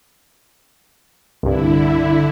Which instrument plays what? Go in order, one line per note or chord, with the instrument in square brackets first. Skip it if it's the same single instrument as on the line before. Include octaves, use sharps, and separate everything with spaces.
[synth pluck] C2 G2 [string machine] D3 E4